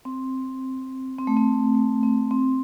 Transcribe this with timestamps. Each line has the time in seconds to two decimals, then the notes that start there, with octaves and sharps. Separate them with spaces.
0.05 C4
1.18 C4
1.27 A3
1.37 C4
1.75 A3
2.03 C4
2.31 C4